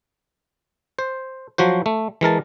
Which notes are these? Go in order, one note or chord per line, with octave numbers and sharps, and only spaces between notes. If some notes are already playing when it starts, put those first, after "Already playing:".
C5
F3 F#3 F#4 C5
A3
E3 G#3 A#4 A5